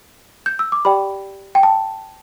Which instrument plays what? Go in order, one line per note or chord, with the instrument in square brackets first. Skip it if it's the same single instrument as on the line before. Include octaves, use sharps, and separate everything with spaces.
[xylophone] G6
E6
D6
G4 D5 G5 B5
G5
A5